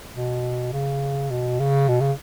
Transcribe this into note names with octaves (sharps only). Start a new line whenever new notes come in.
B2
C#3
B2
C#3
B2
C#3